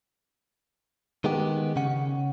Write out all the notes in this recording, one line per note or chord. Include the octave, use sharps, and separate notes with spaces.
D#3 G#3 B3 G4
C#3 C#4 F#5